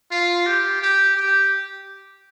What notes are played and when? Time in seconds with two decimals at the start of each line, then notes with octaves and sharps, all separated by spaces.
0.11 F4
0.46 G4
0.82 G4
1.17 G4